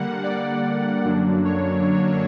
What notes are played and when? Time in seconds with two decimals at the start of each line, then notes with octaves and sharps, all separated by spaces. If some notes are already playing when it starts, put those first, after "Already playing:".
Already playing: D3 G3 A#3 F#5
0.23 D5
1.04 F#2 D3 F#3 A#3 D4
1.45 C#5